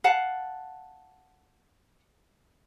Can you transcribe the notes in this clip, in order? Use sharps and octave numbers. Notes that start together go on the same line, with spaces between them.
F5 F#5 A5